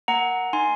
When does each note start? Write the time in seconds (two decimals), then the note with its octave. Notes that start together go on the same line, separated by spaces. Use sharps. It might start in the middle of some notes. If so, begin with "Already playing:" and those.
0.08 A#3 F#5 A#5
0.53 D#4 G#5 C6